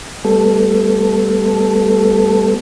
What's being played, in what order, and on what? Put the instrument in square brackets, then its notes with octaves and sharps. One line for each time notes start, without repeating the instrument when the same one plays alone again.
[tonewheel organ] G3 A3 B3 A4